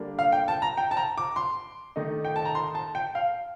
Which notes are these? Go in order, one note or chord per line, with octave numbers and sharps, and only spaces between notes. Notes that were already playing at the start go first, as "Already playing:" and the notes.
Already playing: D3 G3 A#3 D4
F5
G5
A5
A#5
G5
A5
A#5
D6
C6
D#3 A3 D#4
G5
A5
A#5
C6
A5
G5
F5